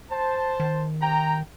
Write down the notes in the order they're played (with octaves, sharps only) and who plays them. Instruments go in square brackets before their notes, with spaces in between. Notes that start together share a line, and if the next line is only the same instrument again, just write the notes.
[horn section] C5 A5
[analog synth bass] D#3
[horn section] C3 G5 A#5